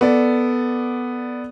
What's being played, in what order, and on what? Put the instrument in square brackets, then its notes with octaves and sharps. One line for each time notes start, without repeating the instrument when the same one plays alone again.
[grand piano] B3 A4 D5